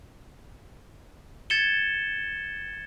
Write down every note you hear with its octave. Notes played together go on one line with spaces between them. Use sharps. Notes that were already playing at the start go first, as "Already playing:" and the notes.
G#6 A6 C#7 E7 G7